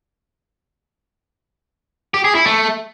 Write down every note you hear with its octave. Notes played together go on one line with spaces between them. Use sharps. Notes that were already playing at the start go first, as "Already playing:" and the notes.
G4
G#4
E4
A3